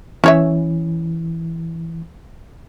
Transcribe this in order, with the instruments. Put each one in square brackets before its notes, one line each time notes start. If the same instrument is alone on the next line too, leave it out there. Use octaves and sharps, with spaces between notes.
[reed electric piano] E3 [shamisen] C#4 C#5 E5